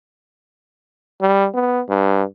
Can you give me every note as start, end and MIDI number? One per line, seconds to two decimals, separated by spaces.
1.21 1.47 55
1.54 1.81 59
1.89 2.23 43